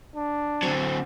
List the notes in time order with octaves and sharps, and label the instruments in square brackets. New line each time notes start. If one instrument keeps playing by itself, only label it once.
[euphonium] D4
[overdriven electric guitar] D3 F#3 [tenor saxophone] C4